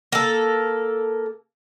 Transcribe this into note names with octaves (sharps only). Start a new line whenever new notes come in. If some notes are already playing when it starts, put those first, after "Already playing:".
A#3 A4